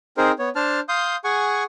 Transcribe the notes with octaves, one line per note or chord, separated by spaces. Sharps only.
C4 D#4 G#4 A#4 C5
B3 C#5
D4 C5 A5 F6
F5 C6 D#6 G6
G#4 F#5 G#5 C#6